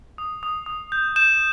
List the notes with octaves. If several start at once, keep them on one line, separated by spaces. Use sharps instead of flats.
D#6
D#6
D#6
G6
G6 E7